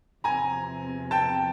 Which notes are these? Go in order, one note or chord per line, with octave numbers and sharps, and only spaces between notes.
E2 C3 F3 G#5 A#5
G5 A5